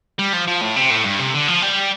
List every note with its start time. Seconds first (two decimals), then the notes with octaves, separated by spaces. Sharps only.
0.19 G3
0.33 F3
0.47 F3
0.61 A2
0.76 C3
0.91 A2
1.04 G2
1.19 C3
1.34 D3
1.48 F3
1.62 G3